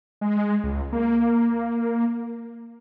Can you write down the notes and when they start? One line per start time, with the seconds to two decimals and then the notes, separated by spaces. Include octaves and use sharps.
0.21 G#3
0.64 C#2
0.92 A#3